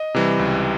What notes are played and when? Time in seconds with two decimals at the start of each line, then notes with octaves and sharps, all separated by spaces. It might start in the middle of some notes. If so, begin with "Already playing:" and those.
Already playing: D#5
0.15 C3 E3 G3
0.39 C#2